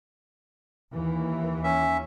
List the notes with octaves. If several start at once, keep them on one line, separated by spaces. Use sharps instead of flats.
D#2 E3
C#4 E5